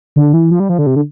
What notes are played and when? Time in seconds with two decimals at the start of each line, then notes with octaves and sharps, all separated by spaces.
0.16 D3
0.33 E3
0.51 F3
0.60 G3
0.69 F3
0.79 D3
0.87 C3
0.96 D3